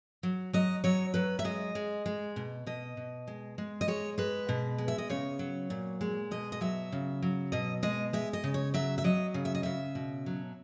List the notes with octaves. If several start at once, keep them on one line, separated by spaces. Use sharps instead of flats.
F#3
F#3 D#5
F#3 C#5
F#3 B4
E5
G#3 D#5
G#3
G#3
B2
B2 D#5
B2
G#3
G#3
D#5
G#3 C#5
G#3 B4
B2
G#3
E5
D#5
C#3 C#5
F#3
A#2
G#3
B2 D#5
D#5
F#3 E5
C#3
F#3
B2 D#5
G#3 D#5
G#3 E5
D#5
C#3
C#5
F#3 E5
E5
F#3 D#5
C#3
E5
D#5
C#3 E5
B2
F#3